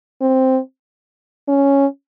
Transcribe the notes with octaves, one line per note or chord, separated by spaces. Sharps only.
C4
C#4